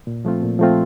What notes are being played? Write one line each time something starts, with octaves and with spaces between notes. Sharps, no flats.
A#2
F3 A3 C4 F4
A#2
F3 A3 C4 F4